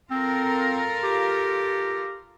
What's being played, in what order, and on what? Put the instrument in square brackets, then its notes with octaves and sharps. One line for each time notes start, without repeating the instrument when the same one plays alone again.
[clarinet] C4 [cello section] F4 A4 A#4
[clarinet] G4